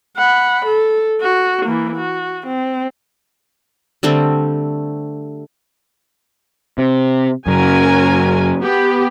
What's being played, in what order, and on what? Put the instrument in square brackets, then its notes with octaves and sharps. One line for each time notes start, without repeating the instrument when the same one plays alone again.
[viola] F#5 B5
A4
F#4
E3 A#3
F#4
C4
[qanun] D3 G3 A3 C4
[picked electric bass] C3
[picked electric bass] F#2 C#3 [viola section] F#4 A#4 G#5
[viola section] B3 G4